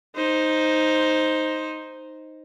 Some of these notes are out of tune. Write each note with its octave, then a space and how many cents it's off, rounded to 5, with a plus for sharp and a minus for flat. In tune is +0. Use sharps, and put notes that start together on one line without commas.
D#4 +0 C5 +0